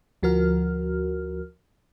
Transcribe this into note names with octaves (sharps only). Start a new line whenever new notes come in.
D2 F3 F#4 A#4 F6